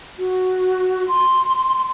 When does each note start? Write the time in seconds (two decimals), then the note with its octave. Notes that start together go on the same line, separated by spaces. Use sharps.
0.19 F#4
1.08 C6